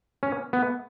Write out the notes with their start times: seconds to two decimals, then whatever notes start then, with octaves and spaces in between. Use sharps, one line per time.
0.23 C#4
0.53 B3